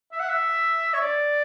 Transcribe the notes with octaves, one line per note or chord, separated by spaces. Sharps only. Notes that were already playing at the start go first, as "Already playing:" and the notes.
E5
F#5
E5
C#5
D5